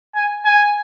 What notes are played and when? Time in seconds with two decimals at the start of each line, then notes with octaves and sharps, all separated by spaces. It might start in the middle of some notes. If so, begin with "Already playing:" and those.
0.15 G#5
0.45 G#5